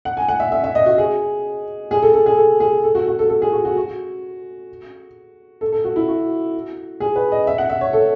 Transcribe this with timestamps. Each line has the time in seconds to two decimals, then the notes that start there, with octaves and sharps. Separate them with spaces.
0.05 F#5
0.17 G#5
0.28 F#5
0.40 E5
0.52 E5
0.64 E5
0.75 D#5
0.86 F#4
0.98 G#4
1.91 G#4
2.02 A4
2.14 A4
2.26 G#4
2.37 A4
2.60 G#4
2.84 A4
2.95 F#4
3.07 F#4
3.19 A4
3.29 A4
3.42 G#4
3.53 F#4
3.65 F#4
3.77 F#4
5.61 A4
5.72 A4
5.85 F#4
5.96 E4
6.08 F#4
7.00 G#4
7.16 B4
7.32 D#5
7.47 E5
7.58 F#5
7.70 E5
7.81 C#5
7.93 A4